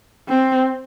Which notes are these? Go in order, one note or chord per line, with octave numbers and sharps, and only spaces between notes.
C4